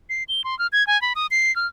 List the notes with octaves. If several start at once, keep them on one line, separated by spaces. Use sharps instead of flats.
C7
G7
C6
F6
G#6
G#5
B5
D#6
C7
F6